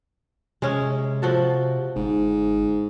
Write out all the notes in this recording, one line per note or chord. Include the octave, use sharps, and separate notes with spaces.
C3 G#3 C#4
F3 F#4 A4
G1 G#2